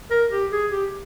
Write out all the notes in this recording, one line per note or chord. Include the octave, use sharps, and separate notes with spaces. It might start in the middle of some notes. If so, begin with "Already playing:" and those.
A#4
G4
G#4
G4